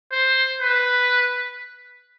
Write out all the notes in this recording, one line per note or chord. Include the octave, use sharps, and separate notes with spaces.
C5
B4